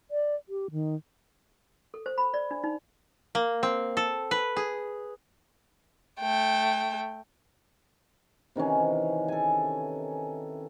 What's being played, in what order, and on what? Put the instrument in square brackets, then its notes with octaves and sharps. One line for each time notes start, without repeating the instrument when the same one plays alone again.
[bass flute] D5
G4
D#3
[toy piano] A4
C5
B5
D5
D4
D#4
[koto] A#3
C4
A4
B4
G#4
[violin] A3 G5
[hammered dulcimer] C3 D#3 E3 C#4
A4 G#5